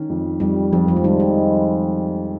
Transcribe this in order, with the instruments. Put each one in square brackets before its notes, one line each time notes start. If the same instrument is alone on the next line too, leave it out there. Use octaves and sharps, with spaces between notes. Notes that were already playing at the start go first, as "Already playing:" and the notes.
Already playing: [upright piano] D#3 C#4
F2
[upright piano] F2 [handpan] G3
[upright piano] F2 [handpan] F3
[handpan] F3
G#3
[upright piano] D#3 [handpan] G3
[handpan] G#3